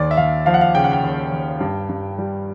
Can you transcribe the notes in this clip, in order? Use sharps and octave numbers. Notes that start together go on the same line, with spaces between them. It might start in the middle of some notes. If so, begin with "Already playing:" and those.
Already playing: D#2 D5
E5
D#2 F5
F3 F5
F#5
F5
C#3 G5
F#5
G5
D#2
D#2
G2
G2
G3